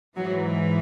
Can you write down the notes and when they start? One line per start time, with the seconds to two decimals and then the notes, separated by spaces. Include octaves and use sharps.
0.17 G#2 E3 F#3